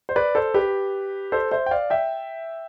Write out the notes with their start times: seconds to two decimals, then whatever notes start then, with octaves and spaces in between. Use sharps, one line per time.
0.09 C5
0.16 B4 D5
0.35 A4 C5
0.54 G4 B4
1.32 A4 C5
1.51 C5 E5
1.66 G5
1.71 D5 F5
1.90 E5 G5